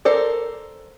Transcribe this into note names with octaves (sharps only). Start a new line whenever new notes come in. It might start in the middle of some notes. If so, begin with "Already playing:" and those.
A4 A#4 C5 D5